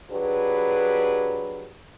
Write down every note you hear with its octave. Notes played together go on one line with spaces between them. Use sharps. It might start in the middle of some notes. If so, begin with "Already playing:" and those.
F#3 D4 G4 G#4 B4